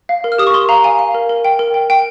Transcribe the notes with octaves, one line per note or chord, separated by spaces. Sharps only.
F5
A#4
F6
G4 D#6
C#6
A#4 C6
F5 A#5
F5 G#5
F5
A#4
A#4
G5
A#4
G5
G5